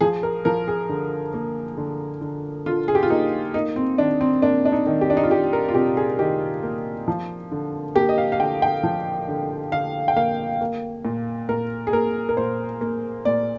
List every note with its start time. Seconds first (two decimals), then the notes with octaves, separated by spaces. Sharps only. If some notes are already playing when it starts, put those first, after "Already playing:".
0.01 F3 G#4
0.23 A#4
0.45 F3 A#4
0.68 G#4
0.89 D3
1.34 A#3
1.77 D3
2.21 D3
2.66 D3 F4
2.88 G#4
2.95 G4
3.03 F4
3.10 A#3 D#4
3.54 A#3 D#4
3.76 C4
3.98 D#3 D4
4.21 C4
4.42 A#3 D4
4.65 D4
4.72 D#4
4.86 D#3
5.01 G4
5.10 D4
5.17 D#4
5.23 F4
5.31 D#3 G4
5.53 A#4
5.68 F4
5.74 C3 G4
5.97 G#4
6.19 D#3 G4
6.63 A#3
7.08 F3
7.52 D3
7.95 A#3 G4
8.09 D#5
8.18 F5
8.32 F5
8.40 D3 G5
8.62 G5
8.83 F3
9.28 D3
9.72 D3 F5
10.08 G5
10.16 A#3 F5
10.61 A#3
11.05 A#2
11.49 A#2 A#4
11.87 G#4
11.93 A#3 A#4
12.29 A#4
12.37 A#2 C5
12.81 A#3
13.25 A#2 D5